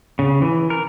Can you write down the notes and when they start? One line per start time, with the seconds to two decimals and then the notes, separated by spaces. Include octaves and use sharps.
0.19 C#3
0.42 E3
0.70 A#4